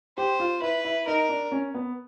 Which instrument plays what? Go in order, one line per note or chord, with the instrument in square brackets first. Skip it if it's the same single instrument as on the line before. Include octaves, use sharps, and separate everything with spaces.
[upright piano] G4 [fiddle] C5
[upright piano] F4
[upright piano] E4 [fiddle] B4
[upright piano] E4
[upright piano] D#4 [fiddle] A#4
[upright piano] D4
C#4
B3